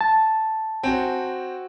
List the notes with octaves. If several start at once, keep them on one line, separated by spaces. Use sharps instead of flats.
A5
C4 F#4 C#5 G#5